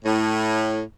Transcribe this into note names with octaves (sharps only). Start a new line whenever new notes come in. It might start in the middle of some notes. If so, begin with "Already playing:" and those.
A2